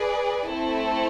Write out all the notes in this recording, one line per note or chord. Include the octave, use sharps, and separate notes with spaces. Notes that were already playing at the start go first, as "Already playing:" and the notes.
Already playing: G#4 B4 D5
A3 C4 E4 A4